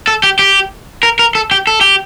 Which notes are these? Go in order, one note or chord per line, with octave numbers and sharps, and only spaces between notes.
A4
G4
G4
A#4
A#4
A4
G4
A4
G4